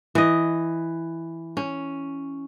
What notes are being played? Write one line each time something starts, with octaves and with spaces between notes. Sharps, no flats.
E3 D#5
C#4